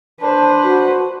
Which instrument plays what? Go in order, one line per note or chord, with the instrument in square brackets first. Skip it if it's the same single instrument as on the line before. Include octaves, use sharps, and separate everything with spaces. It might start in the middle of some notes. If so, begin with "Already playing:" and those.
[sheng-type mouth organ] D4 [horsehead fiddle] B4 C5
[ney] F#4